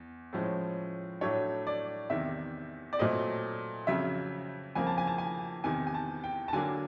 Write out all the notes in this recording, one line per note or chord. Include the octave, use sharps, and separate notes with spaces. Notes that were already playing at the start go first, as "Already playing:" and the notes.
Already playing: E2
A2 F3 G#3 C#4
A2 F#3 A3 D4 C#5
D5
E2 C3 D#3 E5
D5
A#2 F#3 A3 C4 D#5
F2 C#3 F#3 E5
F2 C#3 F3 A#3 G#5
A5
G#5
A5
G#5
E2 C3 D#3 G#5
G#5
A5
G5
A5
D3 F#3 A#3 D4 G#5